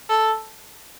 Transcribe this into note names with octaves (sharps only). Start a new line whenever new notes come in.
A4